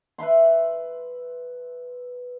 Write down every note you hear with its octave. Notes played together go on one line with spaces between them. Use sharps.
B4 E5 B5 C6